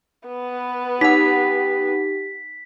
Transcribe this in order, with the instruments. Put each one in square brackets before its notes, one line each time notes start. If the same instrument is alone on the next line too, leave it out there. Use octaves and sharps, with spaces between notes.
[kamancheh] B3 B4
[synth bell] D#4 F#5 [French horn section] G4 [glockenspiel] B6